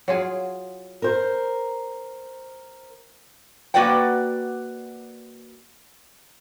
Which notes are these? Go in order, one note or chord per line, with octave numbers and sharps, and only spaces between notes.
F#3 F4 G#4
A#4 C5
A#3 F#4 B4 D5 F#5 G5